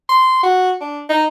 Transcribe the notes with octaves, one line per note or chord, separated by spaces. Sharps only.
C6
F#4
D4
D#4